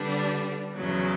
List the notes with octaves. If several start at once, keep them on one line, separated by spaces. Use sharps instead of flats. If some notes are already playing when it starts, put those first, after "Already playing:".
Already playing: D3 G3 B3 D4
E2 C#3 F#3